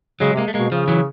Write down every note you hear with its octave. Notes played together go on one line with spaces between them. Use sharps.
C#3 F#3 G#3
C3
G#3 A#3
A3
B2 G#3 A#3
C#3 F3
E3 F#3